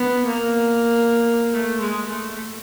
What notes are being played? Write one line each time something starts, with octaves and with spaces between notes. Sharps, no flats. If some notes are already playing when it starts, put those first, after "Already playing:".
Already playing: B3
A#3
A3
G#3
A3